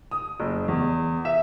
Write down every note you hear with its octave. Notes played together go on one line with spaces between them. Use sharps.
D#6
F#1
E2
E5